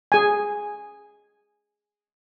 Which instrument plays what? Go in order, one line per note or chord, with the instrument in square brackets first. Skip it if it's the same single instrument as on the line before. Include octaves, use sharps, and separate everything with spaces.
[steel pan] G#4 G#5